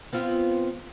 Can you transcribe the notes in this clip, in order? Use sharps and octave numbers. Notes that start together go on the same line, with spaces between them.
B3 C4 F4